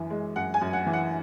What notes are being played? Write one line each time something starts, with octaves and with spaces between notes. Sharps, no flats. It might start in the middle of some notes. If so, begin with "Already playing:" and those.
Already playing: F#2 E3
G#3
F#2 F#5
G#5
F#2
F#5
E3
F#5